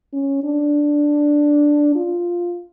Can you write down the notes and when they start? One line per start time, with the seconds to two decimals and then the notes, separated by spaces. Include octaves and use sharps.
0.13 C#4
0.44 D4
1.95 F4